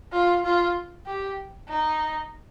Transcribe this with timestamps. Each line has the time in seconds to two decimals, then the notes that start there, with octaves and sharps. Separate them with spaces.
0.12 F4
0.44 F4
1.06 G4
1.68 D#4